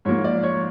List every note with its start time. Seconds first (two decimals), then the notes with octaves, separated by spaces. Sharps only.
0.05 G#2 F3 A#3 C#5
0.24 D5
0.43 C#5